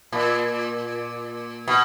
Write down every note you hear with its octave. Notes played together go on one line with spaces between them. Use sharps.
A#2
B2